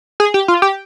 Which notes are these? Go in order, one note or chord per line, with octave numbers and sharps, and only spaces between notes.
G#4
G4
F4
G4